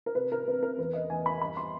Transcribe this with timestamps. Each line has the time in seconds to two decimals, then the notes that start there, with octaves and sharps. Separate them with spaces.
0.06 A#4
0.15 C3 B4
0.32 A#4
0.47 C4 B4
0.63 A#4
0.78 E2 B4
0.93 D#5
1.09 E2 G#5
1.26 B5
1.41 G2 B5
1.57 C6